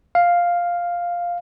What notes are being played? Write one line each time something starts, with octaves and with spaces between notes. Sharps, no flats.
F5